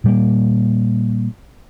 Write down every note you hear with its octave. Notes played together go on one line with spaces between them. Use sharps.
A#2 G3 A#3